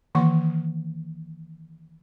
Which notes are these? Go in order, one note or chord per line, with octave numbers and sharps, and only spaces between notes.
D#3 E3 A#3 F#5 C#6